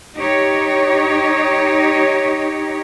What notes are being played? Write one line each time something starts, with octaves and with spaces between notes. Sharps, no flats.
D#4 G4 C#5